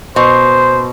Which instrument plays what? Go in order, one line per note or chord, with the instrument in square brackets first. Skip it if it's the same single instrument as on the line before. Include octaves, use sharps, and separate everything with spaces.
[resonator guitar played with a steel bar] B2 [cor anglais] C5